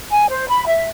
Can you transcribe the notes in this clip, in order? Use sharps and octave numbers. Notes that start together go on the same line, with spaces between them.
G#5
C5
B5
E5